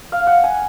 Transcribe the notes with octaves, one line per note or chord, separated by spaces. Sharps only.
F5
F#5
G#5